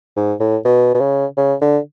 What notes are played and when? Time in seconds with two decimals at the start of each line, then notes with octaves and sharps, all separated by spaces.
0.16 G#2
0.40 A2
0.65 B2
0.94 B2
1.00 C#3
1.37 C#3
1.61 D3